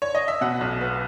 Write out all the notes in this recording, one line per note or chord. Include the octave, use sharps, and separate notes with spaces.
C#5
D#5
E5
B2 F#5
B1
B3